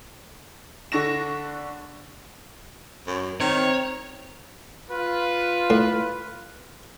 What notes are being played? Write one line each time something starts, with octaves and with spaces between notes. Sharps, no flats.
D3 D4 C#6 A#6 E7
F#2
D#3 C4 C#5
F4 B4
A2